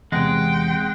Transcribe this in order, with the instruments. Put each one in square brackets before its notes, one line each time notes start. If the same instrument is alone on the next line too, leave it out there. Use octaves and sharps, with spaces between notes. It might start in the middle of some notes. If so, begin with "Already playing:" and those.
[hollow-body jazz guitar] E2 C3 [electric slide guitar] G#3 [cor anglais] F#5 [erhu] G5